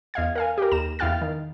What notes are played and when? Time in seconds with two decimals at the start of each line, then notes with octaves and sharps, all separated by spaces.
0.14 E2 D#5 F5 G#6
0.35 A#4 F5 G#5
0.58 G4 A#4
0.72 D#2 A#5 E7
0.99 E2 E4 F5 G5 F6 A6
1.22 D#3